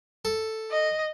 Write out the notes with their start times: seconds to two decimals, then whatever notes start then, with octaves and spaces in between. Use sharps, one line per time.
0.25 A4
0.71 D#5